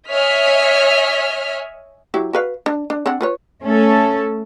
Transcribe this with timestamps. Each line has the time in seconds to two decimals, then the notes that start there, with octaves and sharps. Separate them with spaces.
0.10 C#5 D#5 E5 G#5 F6 B6
2.14 F#3 E4 G4
2.33 F#4 B4 F5
2.66 D4
2.90 D4
3.06 C4 D4 F#5
3.21 F4 B4 C#5
3.63 A3 C#4 A4